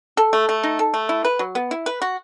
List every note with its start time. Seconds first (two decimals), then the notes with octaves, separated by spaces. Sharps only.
0.17 A4
0.33 A3
0.49 A3
0.63 D#4
0.79 A4
0.94 A3
1.09 E4
1.25 B4
1.39 F#3
1.55 B3
1.71 E4
1.86 B4
2.02 F#4